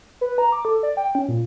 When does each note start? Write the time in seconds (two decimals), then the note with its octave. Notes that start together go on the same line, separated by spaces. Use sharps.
0.21 B4
0.38 A#5
0.52 D6
0.65 A4
0.83 D5
0.97 G5
1.15 C#4
1.28 A#2